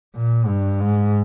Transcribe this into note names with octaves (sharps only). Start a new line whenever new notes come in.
A#2
G2
G#2